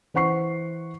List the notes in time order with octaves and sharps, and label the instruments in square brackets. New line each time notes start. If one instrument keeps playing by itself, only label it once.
[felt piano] E3 C5 F#5 C#6 C7